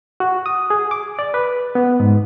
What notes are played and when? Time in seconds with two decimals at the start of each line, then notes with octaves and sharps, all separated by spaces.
0.20 F#4
0.46 D#6
0.70 G#4
0.91 D6
1.19 D5
1.34 B4
1.75 B3
2.00 G#2